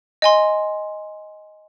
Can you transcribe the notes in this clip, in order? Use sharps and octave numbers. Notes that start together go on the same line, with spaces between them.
D#5 G#5 C6